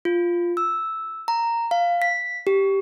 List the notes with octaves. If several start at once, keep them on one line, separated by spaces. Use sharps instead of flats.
F4
E6
A#5
F5
B6
G4